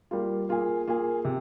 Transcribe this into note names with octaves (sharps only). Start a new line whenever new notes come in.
G3 A#3 F4
A#3 F4 G#4
A#3 F4 G#4
C3